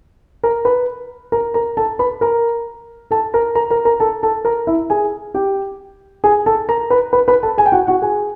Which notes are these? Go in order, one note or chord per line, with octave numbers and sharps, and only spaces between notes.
A#4 A#5
B4 B5
A#4 A#5
A#4 A#5
A4 A5
B4 B5
A#4 A#5
A4 A5
A#4 A#5
A#4 A#5
A#4 A#5
A#4 A#5
A4 A5
A4 A5
A#4 A#5
E4 E5
G#4 G#5
G4 G5
G#4 G#5
A4 A5
A#4 A#5
B4 B5
B4 B5
B4 B5
A4 A5
G#4 G#5
G5
F#4 F#5
F#4 F#5
G#4 G#5